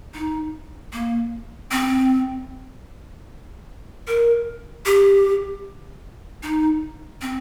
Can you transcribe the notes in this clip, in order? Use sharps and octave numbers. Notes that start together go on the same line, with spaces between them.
D#4
A#3
C4
A#4
G4
D#4
C4